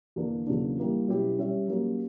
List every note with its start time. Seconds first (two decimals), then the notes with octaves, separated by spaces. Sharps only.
0.16 E2 D3 A#3 D4 A#4
0.47 E2 C#3 F#3 A#3 D4
0.78 G3 A#3 E4
1.08 B2 F#3 C#4 E4 G4
1.38 G3 C#4 G4 C#5 E5
1.68 F#3 A#3 C#4 G4